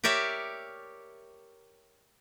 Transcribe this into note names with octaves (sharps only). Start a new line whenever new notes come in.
G4 A#4 C#5 D5 E5